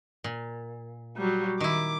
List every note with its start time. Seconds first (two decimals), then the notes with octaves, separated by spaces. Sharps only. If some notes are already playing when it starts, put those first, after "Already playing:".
0.24 A#2
1.17 F#3 G3
1.60 D#3 E4 D6